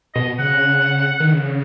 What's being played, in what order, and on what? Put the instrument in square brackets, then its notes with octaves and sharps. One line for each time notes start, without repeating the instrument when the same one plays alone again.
[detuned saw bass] B2 [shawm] D#5
[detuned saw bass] C#3 [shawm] F#5
[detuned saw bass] D#3
C#3